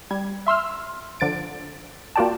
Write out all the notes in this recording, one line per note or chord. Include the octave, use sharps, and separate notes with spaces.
G3 G#6
E5 C6 E6 F6
D3 F3 A6 D7
A#3 F4 F#4 D5 G5 A5